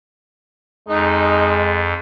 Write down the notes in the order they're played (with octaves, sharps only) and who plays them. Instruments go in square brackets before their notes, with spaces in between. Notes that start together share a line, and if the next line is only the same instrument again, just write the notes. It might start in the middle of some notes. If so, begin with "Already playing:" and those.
[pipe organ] F2 [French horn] G#3 [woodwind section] D#4